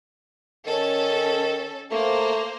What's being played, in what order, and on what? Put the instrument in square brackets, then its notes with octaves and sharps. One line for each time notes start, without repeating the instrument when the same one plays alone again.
[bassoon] D#3 [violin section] C#4 A4
[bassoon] A3 [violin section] A#3 C5